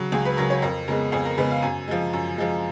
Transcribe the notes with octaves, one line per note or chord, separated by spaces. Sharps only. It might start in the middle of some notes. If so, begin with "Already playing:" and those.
Already playing: C#3 F#3
C#2 G#4
B4
C#3 F#3 A#4
C#5
F2 A#4
C#3 G#3 B3 A#4
F2 G#4
A#4
C#3 G#3 B3 B4
F5
F#2 G#5
F3 G#3
F#2
F3 G#3